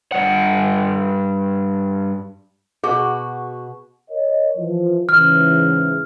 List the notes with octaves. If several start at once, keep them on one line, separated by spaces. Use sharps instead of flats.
G2 F#5
B2 F#4 G#4
A#4 C#5 D#5
E3 F3
G#2 C#3 E3 F6